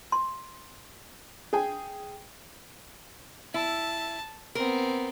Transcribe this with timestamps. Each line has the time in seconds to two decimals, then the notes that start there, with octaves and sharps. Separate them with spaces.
0.12 C6
1.53 G#4 G5 G#5
3.54 E4 A5
4.55 B3 C4 A#4